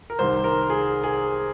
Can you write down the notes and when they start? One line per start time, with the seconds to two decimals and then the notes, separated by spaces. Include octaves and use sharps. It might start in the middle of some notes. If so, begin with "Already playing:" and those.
0.10 A#4
0.19 C2 C3 D#3 C5
0.44 A#4
0.70 G#4
1.04 G#4